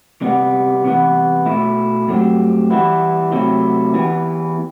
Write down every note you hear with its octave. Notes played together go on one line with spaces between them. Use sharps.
C3 G3 B3
C2 C3 E3 B3
B2 A3 E4
G2 F#3 A3 C4 G4
E3 G3 B3 E4
C3 F#3 A3 C4 E4
E3 B3 E4 G4 B4